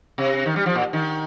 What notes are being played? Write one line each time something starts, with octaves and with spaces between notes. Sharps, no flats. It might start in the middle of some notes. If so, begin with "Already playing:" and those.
C3
D#3
G3
F3
A#2
D#3